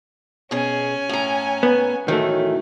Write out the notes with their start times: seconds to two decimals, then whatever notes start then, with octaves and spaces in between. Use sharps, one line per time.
0.51 B2 C#4 G#4 G#5
1.09 A2 A#5
1.63 B3
2.08 A2 D#3 E3 F#3 A3